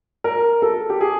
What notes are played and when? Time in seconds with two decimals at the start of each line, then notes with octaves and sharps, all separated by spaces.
0.24 A#4
0.62 A4
0.90 G4
1.01 G#4